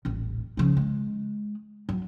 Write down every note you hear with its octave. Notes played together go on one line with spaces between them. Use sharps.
D#1 A1
C#3 F3
G#3
F#3